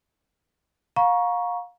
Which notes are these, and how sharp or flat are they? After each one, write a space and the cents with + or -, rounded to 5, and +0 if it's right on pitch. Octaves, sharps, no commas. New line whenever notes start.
F5 +30 A#5 +25 C#6 +0